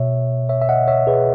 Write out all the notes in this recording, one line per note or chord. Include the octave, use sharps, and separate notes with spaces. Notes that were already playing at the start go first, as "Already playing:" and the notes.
Already playing: B2 C#5 E5
C#5 E5
E5
D#5 F#5
C#5 E5
G#4 B4